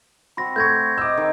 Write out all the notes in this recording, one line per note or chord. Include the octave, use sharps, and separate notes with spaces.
C4 F#4 B5 A#6
A3 C#6 G6 G#6 A#6
D#5 D6 E6 G6
D#3